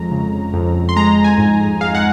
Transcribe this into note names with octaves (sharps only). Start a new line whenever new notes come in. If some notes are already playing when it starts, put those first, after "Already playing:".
Already playing: F2 G#3 A#5
C#3
F2
C6
G#3 A#5
G#5
G#2
G#3 F5
F#5